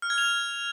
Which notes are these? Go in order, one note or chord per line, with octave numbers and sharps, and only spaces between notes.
F6
G#6
F7